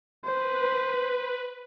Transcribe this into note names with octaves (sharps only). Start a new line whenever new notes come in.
B4 C5